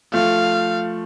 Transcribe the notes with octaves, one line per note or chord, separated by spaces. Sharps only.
F3 A3 F5